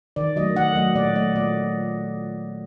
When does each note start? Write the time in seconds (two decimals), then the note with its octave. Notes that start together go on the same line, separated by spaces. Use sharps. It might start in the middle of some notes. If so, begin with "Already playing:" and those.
0.16 D#3 D5
0.36 F#3 A3 D#5
0.56 D#3 F#5
0.76 F#3 A3 D#5
0.95 A#2 D5
1.16 A3 D#5
1.35 A#2 D5